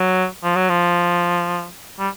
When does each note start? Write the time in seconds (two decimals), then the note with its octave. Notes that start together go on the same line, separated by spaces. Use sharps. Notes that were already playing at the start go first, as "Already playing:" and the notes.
Already playing: F#3
0.43 F3
0.56 F#3
0.69 F3
1.99 G3